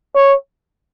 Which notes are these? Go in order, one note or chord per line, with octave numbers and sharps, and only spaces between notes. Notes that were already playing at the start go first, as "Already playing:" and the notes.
C#5